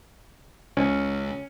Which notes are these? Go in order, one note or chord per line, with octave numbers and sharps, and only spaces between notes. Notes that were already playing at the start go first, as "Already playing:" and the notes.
C#2 C#4